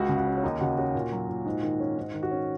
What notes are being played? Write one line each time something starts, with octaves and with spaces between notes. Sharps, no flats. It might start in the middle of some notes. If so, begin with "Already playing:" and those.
Already playing: C#2 F#4 F#5
C#3
F#4 F#5
C#4
C#5
D#2 D#4 D#5
C#3 F#4 F#5
C#4 F#4
A#2
F#3
A#2
G#2
D#3
C#4
G#2
D#3
F#4
C#4